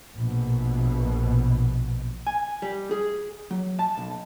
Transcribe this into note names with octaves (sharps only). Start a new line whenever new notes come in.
A#1 B2
G#5
G3
G#4
F#3
A5
B1